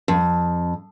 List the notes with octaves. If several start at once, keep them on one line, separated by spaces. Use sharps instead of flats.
F2